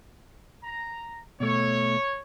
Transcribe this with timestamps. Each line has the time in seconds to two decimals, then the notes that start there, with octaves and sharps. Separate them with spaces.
0.64 A#5
1.40 B2 A3 C#5